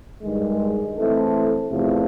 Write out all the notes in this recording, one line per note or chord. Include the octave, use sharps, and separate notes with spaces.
G2 D#3 G#3
E3 A3 C4 E4 A4
E2 C3 F3 A3